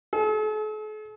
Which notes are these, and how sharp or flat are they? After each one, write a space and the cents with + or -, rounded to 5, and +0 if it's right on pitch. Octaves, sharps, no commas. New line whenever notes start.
A4 -45